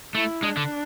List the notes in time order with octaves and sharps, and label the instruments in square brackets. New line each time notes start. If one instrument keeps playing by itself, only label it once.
[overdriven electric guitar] A3 [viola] E4
[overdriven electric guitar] G#3 [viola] D4
[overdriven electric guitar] D3